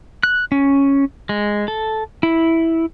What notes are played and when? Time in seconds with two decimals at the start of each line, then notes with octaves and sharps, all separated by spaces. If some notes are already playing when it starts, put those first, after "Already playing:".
0.23 F#6
0.52 C#4
1.29 G#3
1.68 A4
2.23 E4